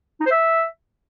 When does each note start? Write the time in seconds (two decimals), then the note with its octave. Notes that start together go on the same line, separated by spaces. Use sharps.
0.20 D#4
0.26 C5
0.31 E5